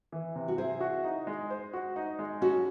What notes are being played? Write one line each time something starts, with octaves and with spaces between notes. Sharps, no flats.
E3
C3
F#4
E4 G#4 C5
F#4
D#4
G#3
C5
F#4
D#4
G#3
C#4 F#4 A4